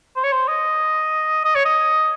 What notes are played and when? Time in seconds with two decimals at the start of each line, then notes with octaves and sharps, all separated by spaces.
0.16 C5
0.24 C#5
0.32 C5
0.48 D#5
1.44 D#5
1.55 C#5
1.65 D#5